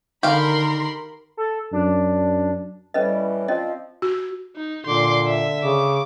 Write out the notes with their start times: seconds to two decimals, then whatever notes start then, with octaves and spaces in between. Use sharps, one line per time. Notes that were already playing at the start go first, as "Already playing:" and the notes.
0.23 D3 D#3 G4 A#4 F5 B5 C6
1.37 A4
1.73 F#2 D4
2.94 A2 E3 G3 C#4 B4 D#5
3.48 F3 C4 C#4 D5 D#5
4.02 F#4
4.56 D#4
4.86 A#2 D3 C6 D6
5.27 E5
5.63 C#3 D6